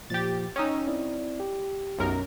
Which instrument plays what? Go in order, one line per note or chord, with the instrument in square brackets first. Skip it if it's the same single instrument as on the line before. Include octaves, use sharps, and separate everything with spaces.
[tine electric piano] A#2 F3 [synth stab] G4 A6
[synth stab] C#4 D#4 [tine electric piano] G5 D#6 E6
[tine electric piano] C4 E4 D5
G4
[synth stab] B1 F#2 A#4